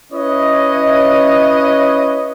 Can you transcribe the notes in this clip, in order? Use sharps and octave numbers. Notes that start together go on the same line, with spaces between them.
C#4 E4 B4 C#5 D#5